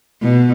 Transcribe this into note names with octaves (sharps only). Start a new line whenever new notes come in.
B2